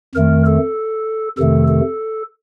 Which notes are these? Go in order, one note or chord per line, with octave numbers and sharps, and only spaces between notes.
F2 D#3 A3 A#4
A4
F2 C3 D#3 A3 A4
A4